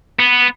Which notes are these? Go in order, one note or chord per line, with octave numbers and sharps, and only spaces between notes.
B3